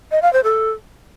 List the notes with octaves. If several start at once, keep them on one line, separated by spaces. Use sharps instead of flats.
D#5
F5
C5
A4